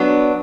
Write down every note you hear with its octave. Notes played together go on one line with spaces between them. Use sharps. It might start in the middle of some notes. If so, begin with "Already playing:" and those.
Already playing: F#3 B3 D4